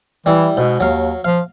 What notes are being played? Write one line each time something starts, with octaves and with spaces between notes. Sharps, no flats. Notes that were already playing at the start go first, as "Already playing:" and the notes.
E3 G3 E4
G#2 B2
D#2 F#3 F5
F3 F5